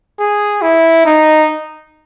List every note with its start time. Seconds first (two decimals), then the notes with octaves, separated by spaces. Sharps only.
0.19 G#4
0.62 E4
1.06 D#4